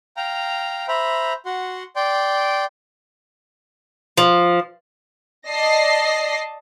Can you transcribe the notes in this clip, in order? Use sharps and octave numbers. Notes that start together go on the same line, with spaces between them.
F5 G5 A#5
C5 E5 A#5 B5
F#4 F#5 C6
D5 G5 C6
F3
D5 D#5 A5 A#6 C7